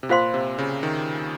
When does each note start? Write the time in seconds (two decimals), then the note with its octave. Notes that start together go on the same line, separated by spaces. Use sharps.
0.03 C3
0.09 A#2 F4 C5 F5 C6
0.34 C3
0.59 C#3
0.83 D#3